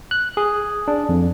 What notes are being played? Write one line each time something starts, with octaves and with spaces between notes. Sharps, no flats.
F#6
G#4
D4
F2